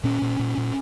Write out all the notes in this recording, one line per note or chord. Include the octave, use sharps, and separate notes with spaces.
A#2 C#4
A#2
A#2
A#2